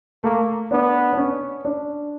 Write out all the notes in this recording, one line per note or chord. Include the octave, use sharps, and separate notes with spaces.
A3 A#3
B3 D4
D4
C#4
D4